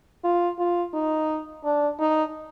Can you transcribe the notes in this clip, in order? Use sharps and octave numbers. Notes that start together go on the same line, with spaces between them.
F4
F4
D#4
D4
D#4